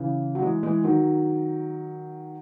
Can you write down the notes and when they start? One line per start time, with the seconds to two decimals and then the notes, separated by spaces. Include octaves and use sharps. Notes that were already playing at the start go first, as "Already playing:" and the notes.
Already playing: C#3 E3
0.35 F#3
0.42 E3 G#3
0.63 E3 G#3
0.84 D#3 F#3